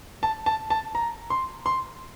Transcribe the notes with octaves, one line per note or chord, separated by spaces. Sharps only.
A5
A5
A5
A#5
C6
C6